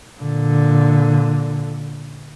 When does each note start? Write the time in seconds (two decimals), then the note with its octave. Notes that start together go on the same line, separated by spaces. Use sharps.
0.20 A#2 D3